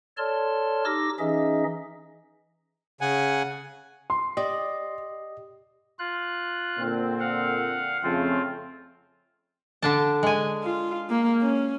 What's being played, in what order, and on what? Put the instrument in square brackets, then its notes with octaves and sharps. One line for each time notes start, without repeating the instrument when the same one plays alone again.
[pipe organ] A4 C#5 D5 A5 C6 F6
D#4 G4 D6 E6 A#6
E3 C#4 D#4 G#4 D#5 E5
[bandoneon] C#3 F#5 G#5
[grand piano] C6
[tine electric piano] G4 D#5 [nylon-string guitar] D5
[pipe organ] F4 F#6
[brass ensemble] A#2 D3 C4
[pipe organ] F5 F#5
[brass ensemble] F2 C#3 A3 [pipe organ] C4 F4
[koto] D3 D4 A5
G#3 G#5
[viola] F4
A#3
C#4